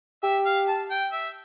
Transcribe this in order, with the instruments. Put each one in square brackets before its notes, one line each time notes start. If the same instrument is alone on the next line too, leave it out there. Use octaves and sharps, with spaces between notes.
[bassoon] G4 [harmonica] E5
[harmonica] F5
A5
G5
E5